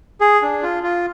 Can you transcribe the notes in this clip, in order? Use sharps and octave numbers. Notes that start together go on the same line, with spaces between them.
G#4
D4
F4
F4